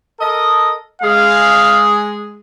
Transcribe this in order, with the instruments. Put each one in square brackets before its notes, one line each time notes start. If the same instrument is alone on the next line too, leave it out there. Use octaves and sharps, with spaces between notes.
[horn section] A4 A#4 D#5
[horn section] G#3 G#4 [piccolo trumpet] F5